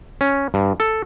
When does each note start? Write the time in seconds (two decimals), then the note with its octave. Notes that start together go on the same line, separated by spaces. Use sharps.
0.21 C#4
0.54 G2
0.80 A4